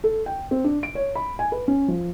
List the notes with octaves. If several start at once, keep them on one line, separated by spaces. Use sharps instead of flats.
A4
G5
C4
D4
D7
C#5
B5
G#5
B4
C#4
F3